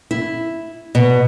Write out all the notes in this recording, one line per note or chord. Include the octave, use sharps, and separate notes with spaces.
E4
B2